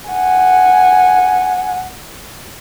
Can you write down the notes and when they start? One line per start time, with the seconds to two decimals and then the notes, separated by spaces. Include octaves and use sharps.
0.10 F#5 G#5